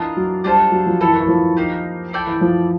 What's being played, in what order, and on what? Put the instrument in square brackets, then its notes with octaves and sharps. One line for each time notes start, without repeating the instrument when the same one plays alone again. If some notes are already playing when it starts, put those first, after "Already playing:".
Already playing: [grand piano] E3 [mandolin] D4 F4 A#4 D#5
[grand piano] F#3
[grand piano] G3 [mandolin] D4 F4 A4 C5
[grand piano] F#3
F3
[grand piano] E3 [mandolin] E4 A4 C#5
[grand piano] D#3
E3
F3
[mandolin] A#3 D#4 G4
E4 A4 D5 G5
[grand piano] E3
F3